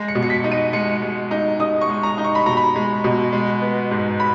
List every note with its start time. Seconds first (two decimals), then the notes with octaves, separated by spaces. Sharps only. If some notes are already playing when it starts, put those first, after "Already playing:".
Already playing: G#3 A#6
0.08 C#7
0.15 B2
0.23 C#7
0.30 B6
0.44 D#4
0.52 D#7
0.73 G#3 C#7
1.02 G#3
1.31 D#4
1.60 D#4 D#6
1.81 C#6
1.89 G#3
2.03 A#5
2.18 D#4
2.25 C#6
2.35 B5
2.46 B2 A#5
2.57 B5
2.76 G#3
3.04 B2
3.33 G#3
3.62 B3
3.91 G#2
4.20 B5